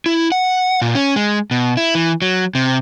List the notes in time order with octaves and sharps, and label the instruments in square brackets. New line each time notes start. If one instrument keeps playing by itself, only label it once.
[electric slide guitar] E4
F#5
A#2
C#4
G#3
B2
E4
E3
F#3
C3